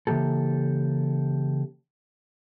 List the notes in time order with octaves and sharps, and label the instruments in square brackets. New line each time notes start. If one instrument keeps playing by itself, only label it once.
[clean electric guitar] C#3 E3 A#3 G4 A4